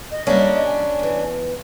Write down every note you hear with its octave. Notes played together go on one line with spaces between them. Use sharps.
D#5
G3 A#3 C#4 D4
G#5
E2 E3